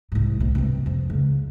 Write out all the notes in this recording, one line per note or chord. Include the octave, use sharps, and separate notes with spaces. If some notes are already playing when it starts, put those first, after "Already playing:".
C2 G#2
D2 B2
G2 C3
F2
C#2